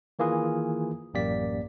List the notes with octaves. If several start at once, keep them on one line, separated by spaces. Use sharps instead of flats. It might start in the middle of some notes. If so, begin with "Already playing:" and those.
D#3 E3 A#3 F4 G#4 B4
A1 F#2 A#3 G4 D5 B6